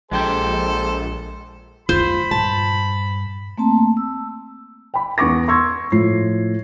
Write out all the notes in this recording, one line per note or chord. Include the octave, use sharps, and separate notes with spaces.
A#1 G#3 G4 A4 C5 G5
F2 G#3 F4 C5 B5
G2 A#2 A5
A3 A#3 C4 A5
E6
G5 B5
E2 B3 C#6 D6 A#6
C6 C#6 E6 G#6
A2 F3 C7